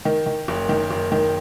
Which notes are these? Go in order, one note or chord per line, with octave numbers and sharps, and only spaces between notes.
D#3
D#3
F#1
D#3
F#1
D#3